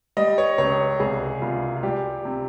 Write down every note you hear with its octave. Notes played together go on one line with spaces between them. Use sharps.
G3 D#5
C#5
C#2 C#5
C2 G#4
C2 F4
F4
G3 G4
C3